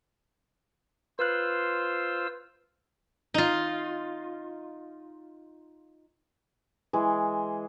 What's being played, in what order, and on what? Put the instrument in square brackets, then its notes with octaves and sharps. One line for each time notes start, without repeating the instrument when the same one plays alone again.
[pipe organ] F4 C5 E6 [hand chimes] B4 F#6
[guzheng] D#4 F4
[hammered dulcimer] E3 G#3